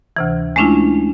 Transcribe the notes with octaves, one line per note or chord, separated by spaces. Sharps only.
D2 C3 E3
G#3 A3 C#4 D4 E4 F4